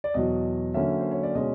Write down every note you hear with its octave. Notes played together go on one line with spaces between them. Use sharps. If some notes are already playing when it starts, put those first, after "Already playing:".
D5
E2 B2 F#3 D#5
D3 F#3 A#3 C#4 E5
C5
C#5
D5
B2 G#3 C#4 D#5